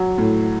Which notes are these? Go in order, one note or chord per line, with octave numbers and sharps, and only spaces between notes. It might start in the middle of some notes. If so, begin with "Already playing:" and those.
Already playing: F#3
A2